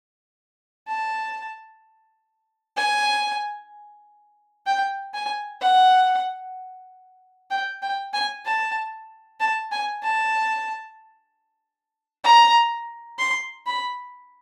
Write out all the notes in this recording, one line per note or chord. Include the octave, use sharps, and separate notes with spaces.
A5
G#5
G5
G#5
F#5
G5
G5
G#5
A5
A5
G#5
A5
A#5
C6
B5